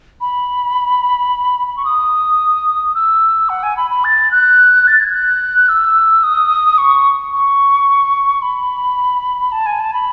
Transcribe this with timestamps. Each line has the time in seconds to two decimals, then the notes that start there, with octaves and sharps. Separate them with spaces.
0.21 B5
1.68 B5
1.77 C#6
1.85 D#6
2.95 E6
3.49 F#5
3.63 G#5
3.77 B5
3.91 B5
4.04 A6
4.31 F#6
4.87 A6
5.01 G#6
5.14 F#6
5.69 E6
6.23 D#6
6.78 C#6
7.33 C#6
8.42 B5
9.52 A5
9.66 G#5
9.80 A5
9.93 B5